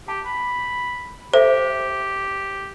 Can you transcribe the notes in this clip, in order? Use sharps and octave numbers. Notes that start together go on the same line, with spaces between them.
G4 A5
B5
G4 A4 C5 E5